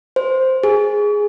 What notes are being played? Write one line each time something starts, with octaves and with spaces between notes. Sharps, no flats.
C5
G#4